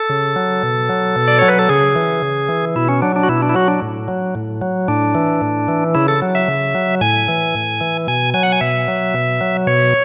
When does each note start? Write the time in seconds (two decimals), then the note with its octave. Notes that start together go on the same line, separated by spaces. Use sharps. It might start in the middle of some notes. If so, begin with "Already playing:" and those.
Already playing: A4
0.10 C#3
0.36 F#3
0.63 B2
0.89 F#3
1.16 B2
1.28 D5
1.39 F#3 C#5
1.48 B4
1.59 A4
1.69 C#3 G#4
1.96 E3
2.22 C#3
2.49 E3
2.76 B2 E4
2.89 C#4
3.02 F#3 D4
3.16 D4
3.23 F#4
3.29 B2 E4
3.42 D4
3.49 E4
3.55 F#3 F#4
3.68 D4
3.82 A2
4.08 F#3
4.35 A2
4.62 F#3
4.88 A2 D4
5.15 E3
5.41 A2
5.68 E3
5.95 C#3 E4
6.08 A4
6.22 F#3
6.35 E5
6.48 C#3
6.75 F#3
7.01 A2 G#5
7.28 E3
7.55 A2
7.81 E3
8.07 B2 G#5
8.34 F#3 G#5
8.43 F#5
8.52 G#5
8.61 B2 E5
8.88 F#3
9.14 B2
9.41 F#3
9.67 B2 C#5